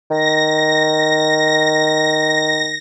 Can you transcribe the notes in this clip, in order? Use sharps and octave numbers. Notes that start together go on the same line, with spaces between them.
D#3 A#6